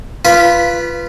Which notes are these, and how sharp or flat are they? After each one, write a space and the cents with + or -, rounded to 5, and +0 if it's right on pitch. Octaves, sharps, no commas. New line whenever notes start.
F4 -20 B4 +0 B5 -20